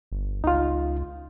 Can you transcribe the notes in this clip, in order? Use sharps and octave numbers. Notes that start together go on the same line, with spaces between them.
G1
C#2 D#4 F4